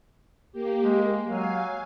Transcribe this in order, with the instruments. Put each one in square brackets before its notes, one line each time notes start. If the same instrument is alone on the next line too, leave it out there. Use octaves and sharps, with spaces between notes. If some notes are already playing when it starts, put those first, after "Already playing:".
[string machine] A#3 G4
[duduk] G#3
[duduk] F#3 [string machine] F5 G#5